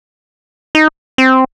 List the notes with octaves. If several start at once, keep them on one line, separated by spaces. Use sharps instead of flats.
D#4
C4